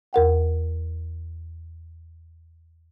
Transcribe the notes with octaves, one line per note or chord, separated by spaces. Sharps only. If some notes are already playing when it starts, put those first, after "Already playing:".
E2 A#4 F#5 G5